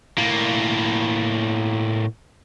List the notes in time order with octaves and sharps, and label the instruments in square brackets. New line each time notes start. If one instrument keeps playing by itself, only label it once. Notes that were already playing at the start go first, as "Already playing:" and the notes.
[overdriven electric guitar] A2 A#3